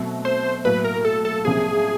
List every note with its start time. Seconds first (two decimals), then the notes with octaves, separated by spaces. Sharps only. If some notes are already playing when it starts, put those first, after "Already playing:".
Already playing: B2 F#3 A3 C4
0.25 C5
0.65 A2 F#3 A#3 B4
0.84 A#4
1.05 A4
1.25 A4
1.45 C2 C3 F3 A#3 C#4 G#4